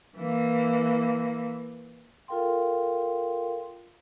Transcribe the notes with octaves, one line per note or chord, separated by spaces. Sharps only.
E3 A#3
F4 A4 A#4 F5 G5 C6